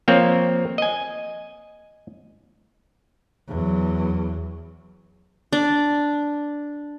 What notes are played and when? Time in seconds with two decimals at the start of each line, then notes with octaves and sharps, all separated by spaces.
0.08 F3 A#3 C4 C#5
0.78 D#5 G#5
3.48 E2 F#3
5.53 D4